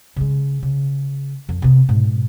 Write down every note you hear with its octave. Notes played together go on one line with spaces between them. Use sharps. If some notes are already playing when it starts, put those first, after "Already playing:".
C#3 G#3
C#3
F2
C3 B3
G#2 B2